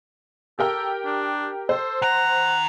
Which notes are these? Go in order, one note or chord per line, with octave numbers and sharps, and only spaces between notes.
G4 A4 A#4 G5
D4
A4 C5
D#3 F#5 A#5